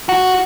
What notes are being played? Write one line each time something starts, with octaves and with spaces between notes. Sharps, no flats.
F#4